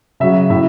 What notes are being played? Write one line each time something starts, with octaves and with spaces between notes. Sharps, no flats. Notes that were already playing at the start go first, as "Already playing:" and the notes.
C#3 F#3 E5
A2 E5